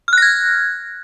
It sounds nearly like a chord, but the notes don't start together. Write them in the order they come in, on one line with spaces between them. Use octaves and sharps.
F6 F#6 A#6 G#6